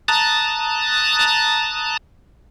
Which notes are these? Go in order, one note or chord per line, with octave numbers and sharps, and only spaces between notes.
A5 A#5 D#6 F#6 A6